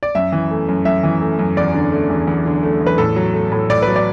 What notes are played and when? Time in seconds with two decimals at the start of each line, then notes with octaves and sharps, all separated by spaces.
0.03 D5
0.15 F#2 E5
0.32 E3
0.51 A3
0.68 F#2
0.85 F#2 E5
1.03 E3
1.21 A3
1.39 F#2
1.57 E2 D5
1.74 D3
1.92 A3
2.10 E2
2.28 E2
2.46 D3
2.63 A3
2.81 E2
2.86 B4
2.98 A2 A4
3.16 F#3
3.34 A3
3.52 A2
3.69 A2 D5
3.82 B4
3.88 F#3
3.96 D5